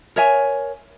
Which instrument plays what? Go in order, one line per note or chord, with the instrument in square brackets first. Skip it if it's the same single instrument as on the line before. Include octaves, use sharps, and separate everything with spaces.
[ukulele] A#4 C#5 E5 G#5